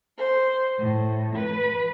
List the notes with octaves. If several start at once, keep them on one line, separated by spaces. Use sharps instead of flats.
C5
A2
B4